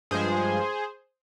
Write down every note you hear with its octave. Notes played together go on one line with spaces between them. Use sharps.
G2 F3 G#3 G#4 C5